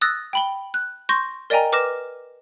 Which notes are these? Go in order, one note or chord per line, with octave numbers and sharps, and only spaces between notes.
D#6 E6 F#6 A6 A#6
G5 B5 G7
F#6
C6 C#6 G6 A#6
A#4 D5 D#5 G5 G#5 A#5
B4 D6 F6 A#6 E7